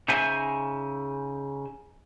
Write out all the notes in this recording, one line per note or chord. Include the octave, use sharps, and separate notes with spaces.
C#3 D#4 C5 E5 G#5